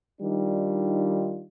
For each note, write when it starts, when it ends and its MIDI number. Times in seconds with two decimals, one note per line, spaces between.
0.21 1.44 51
0.21 1.44 55
0.21 1.44 62
0.21 1.44 63
0.21 1.44 65